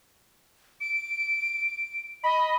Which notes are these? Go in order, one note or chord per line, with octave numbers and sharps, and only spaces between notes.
D7
D#5 B5